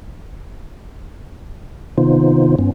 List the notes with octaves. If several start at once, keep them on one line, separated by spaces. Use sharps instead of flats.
C3 D#3 B3 D#4 F4 C5
G2 B3 C#4